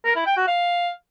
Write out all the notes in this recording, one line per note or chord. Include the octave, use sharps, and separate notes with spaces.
A#4
E4
G5
F#4
F5